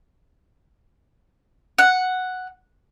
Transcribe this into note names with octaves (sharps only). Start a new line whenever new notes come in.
F#5